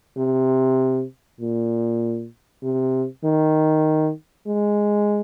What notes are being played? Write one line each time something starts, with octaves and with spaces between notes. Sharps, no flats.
C3
A#2
C3
D#3
G#3